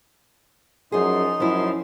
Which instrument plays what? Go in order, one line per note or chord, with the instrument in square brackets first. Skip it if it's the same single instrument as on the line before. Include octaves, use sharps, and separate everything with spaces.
[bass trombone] F#2 [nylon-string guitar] F3 G#4 [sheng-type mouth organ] D#4 C6
[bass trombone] F#2 [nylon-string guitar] F3 E4